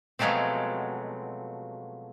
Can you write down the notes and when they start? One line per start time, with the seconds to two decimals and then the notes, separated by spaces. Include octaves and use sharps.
0.19 B2 F3 F#3 G#3 A3 C4